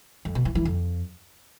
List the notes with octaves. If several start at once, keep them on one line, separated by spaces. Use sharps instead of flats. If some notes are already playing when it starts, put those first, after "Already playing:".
F2
B2
E3
E3
F2